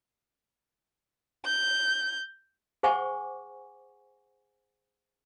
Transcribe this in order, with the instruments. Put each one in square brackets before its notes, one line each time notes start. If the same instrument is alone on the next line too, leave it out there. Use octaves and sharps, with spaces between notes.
[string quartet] G6
[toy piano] G#4 C5 F#5 G#5 C#6 D6